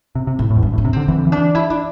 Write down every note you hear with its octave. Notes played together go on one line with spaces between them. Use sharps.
C3
C3
A2 E4
A2
E2
G2 D4
A2
D4
C3
D3 C4
E3 C4
D3
E3
D4
E4
D4